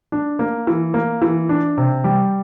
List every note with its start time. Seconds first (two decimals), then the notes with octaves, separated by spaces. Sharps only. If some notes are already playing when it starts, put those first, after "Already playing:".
0.12 D4
0.39 A#3
0.67 E3
0.94 A#3
1.22 E3
1.49 D4
1.78 C3
2.04 G3